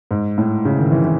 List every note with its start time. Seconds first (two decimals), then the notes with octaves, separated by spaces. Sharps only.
0.11 G#2
0.38 A2
0.65 C#3
0.79 D#3
0.92 E3
1.04 E3